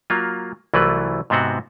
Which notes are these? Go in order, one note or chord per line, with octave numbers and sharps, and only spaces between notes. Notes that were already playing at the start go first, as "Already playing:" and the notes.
F#3 A#3 F4
C2 E3 F#3 A3 F4 B4
G#2 C3 B3 C4 F#4